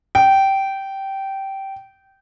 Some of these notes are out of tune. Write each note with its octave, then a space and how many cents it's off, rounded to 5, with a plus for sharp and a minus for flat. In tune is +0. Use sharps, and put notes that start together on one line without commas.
G5 -15